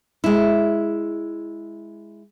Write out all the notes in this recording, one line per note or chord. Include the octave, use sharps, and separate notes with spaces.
G#3 E4